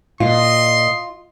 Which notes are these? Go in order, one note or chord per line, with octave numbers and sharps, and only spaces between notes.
A#2 F4 D#5 C6